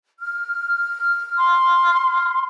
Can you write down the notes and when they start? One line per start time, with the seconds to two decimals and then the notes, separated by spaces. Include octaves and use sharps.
0.20 F6
1.37 C6